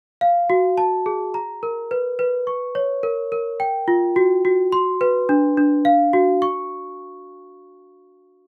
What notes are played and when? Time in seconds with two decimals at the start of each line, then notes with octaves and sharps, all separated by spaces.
0.21 F5
0.50 F#4
0.78 A5
1.06 G#4
1.34 A#5
1.63 A#4
1.91 B4
2.19 B4
2.47 C#6
2.75 C#5
3.03 A#4
3.32 A#4
3.60 G5
3.88 F4
4.16 F#4
4.45 F#4
4.72 C6
5.01 B4
5.29 D4
5.57 D4
5.85 F5
6.13 F#4
6.42 C#6